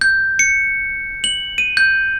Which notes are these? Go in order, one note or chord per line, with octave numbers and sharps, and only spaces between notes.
G6
C#7
F#7
D#7
G6